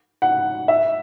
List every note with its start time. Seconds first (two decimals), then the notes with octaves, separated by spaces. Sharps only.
0.22 F#5
0.68 E5